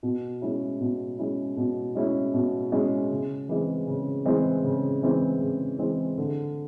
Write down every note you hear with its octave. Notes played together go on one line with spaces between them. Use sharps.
B2
G#3 C#4 E4
B2
G#3 C#4 E4
B2
G#3 C#4 E4
B2
G#3 C#4 E4
C#3
E3 G#3 C4
C#3
E3 G#3 C4
C#3
E3 G#3 C4
C#3
E3 G#3 C4
D3